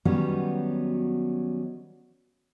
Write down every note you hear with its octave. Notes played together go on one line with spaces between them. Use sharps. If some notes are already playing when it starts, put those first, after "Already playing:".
D#3 F#3 G3 B3 C#4 F#4